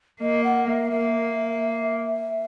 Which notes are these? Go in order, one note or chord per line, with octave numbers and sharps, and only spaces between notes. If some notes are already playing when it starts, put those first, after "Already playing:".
A#3 D#5
F#5
E5
A#3 E5